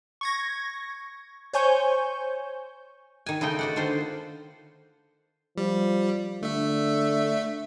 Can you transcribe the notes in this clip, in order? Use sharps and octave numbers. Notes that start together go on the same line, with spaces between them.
C#6 G#6 A#6
C5 C#5 G#5 C#6 G6
D#3 G#5
C#3 G#3 A3 D#4 G5
F#4 D5 F#5
D3 D#3 F4 C5
F3 G3
D3 A3 E5